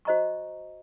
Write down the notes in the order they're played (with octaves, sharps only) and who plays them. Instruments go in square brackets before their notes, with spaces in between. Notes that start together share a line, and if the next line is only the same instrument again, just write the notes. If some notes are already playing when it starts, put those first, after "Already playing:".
[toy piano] F#4 C5 D#5 A#5 C#6